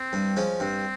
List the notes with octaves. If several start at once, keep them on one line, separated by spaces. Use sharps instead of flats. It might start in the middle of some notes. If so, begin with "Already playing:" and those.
Already playing: C4
G2
F3 G#3 C#4
G2 C4